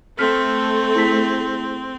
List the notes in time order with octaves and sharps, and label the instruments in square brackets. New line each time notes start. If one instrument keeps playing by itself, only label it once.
[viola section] A3 [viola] C4 [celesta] F6 B6
[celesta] E4 G#4 B6